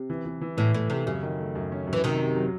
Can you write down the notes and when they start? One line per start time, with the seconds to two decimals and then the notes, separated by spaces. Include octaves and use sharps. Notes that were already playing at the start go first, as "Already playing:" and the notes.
Already playing: C3
0.10 E3
0.25 E3
0.41 E3
0.57 A2 E3
0.74 A2 A3
0.90 C3 A3
1.06 F#2 C#3
1.23 D#3
1.40 A3
1.55 F#2
1.72 C#4
1.87 F#2
1.93 E3
2.04 C3 D#3 F#3
2.20 F#3
2.36 F#3